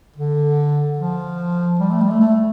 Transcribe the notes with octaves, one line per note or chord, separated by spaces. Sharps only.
D3
F3
G3
A3
G3
A3
A3